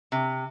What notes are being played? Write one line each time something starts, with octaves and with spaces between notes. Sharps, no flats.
C3